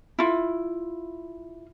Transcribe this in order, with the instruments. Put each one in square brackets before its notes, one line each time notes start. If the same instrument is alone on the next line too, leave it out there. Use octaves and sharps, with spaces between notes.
[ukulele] E4 F4